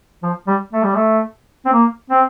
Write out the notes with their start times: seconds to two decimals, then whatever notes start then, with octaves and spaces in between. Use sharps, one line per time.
0.23 F3
0.47 G3
0.73 A3
0.83 G3
0.95 A3
1.66 C4
1.73 A#3
2.10 C4